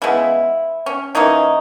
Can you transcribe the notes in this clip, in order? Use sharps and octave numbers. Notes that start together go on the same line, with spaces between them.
C#3 G#3 B3 E4
C#4
E3 A#3 C#4 D#4